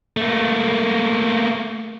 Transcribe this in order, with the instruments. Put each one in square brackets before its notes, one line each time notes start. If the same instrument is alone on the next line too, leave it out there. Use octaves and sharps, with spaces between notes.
[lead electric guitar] A3 A#3